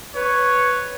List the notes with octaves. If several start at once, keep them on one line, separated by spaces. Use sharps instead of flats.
B4 C#5